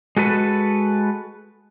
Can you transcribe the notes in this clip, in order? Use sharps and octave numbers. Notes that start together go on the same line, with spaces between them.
G#3 F#4 A4 B4